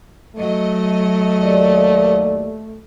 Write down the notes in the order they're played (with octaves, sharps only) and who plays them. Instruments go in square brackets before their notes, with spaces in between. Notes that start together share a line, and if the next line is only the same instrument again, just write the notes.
[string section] F#3 D#5 [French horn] A3
[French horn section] D#2 D5